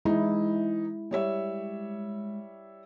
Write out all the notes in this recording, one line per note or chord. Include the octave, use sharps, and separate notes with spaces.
E3 G#3 D#4 E4
G3 C#5 E5